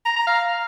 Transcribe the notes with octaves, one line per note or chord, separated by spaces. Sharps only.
A#5
A#5
F5